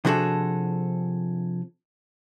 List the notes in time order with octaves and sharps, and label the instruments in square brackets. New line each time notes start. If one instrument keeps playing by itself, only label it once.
[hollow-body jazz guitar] C3 F3 D4 F#4 G#4 A4